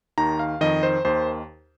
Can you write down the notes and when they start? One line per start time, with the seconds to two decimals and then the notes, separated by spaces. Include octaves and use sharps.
0.18 D#2 D#3 A#5
0.39 F5
0.61 F2 D#3 D#5
0.83 C5
1.05 D#2 D#3 C5